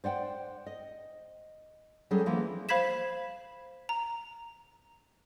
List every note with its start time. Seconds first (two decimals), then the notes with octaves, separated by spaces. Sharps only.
0.04 C5 D5 F#5 G5
0.67 D#5
2.11 F#3 G3 C#4 G#4 A4
2.26 E3 F3 A#3 B3 D4
2.69 C5 F5 B5 G#6 B6 E7
3.89 A#5